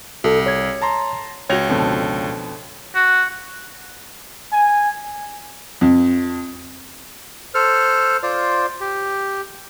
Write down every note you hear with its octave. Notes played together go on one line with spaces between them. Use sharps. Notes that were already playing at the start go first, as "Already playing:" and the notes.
C2 F#4 A4
C#5 G#6
A5 A#5 C6
C#2 F#4 C#5 G#6 A#6 F7
F2 B2 D3
F#4
G#5
F2
A4 C5 F6
F4 C5 D5
G4